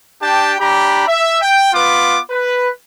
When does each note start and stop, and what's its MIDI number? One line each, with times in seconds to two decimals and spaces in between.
0.21 0.55 62
0.21 0.55 67
0.21 0.55 79
0.21 0.55 81
0.60 1.06 62
0.60 1.06 67
0.60 1.06 82
0.60 1.06 83
1.07 1.41 76
1.41 1.73 79
1.73 2.20 59
1.73 2.20 65
1.73 2.20 71
1.73 2.20 86
2.30 2.70 71